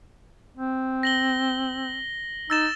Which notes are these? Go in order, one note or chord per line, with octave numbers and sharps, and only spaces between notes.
C4
A#6 F#7 G7
D#4 E6 A6 E7